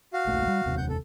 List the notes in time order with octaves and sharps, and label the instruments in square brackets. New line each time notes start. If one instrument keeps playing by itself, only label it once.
[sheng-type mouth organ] F#4 F5
[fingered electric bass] D1 A#1 A3
G3
F1 D#2 C3
[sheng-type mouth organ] F#5 G6
A4